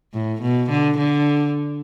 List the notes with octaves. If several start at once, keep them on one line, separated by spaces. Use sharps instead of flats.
A2
B2
D3
D3